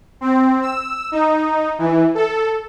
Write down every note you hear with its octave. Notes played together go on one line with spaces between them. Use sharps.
C4
E6
D#4
E3
A4